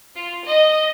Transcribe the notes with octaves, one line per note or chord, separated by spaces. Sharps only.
F4
D#5